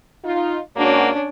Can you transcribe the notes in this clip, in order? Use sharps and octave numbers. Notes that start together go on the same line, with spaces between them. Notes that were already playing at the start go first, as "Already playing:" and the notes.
D#4 F4
G#2 A#3 C#4 D4 F#4